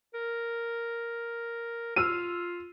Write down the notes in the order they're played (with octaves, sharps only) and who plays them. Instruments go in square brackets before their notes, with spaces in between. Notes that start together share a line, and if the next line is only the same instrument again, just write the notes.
[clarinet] A#4
[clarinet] F4 [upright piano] E6 F6 D#7